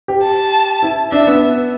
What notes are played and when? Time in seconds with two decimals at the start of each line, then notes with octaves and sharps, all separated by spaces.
0.08 G4
0.23 A5
0.83 E4
1.12 D4 E5
1.27 B3